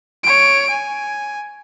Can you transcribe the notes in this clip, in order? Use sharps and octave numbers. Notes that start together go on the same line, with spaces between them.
C#5 D7
G#5